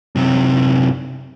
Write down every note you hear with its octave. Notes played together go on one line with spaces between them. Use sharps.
F#2 C3